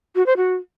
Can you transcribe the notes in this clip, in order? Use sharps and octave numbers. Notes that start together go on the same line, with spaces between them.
F#4
C5
F#4